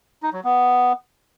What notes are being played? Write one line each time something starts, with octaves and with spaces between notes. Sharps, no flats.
D#4
F#3
B3